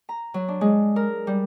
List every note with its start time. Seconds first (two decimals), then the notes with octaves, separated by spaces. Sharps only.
0.09 A#5
0.34 F#3
0.48 D4
0.61 G#3
0.96 A#4
1.27 G3